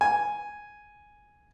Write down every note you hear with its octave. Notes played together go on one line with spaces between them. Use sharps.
G#5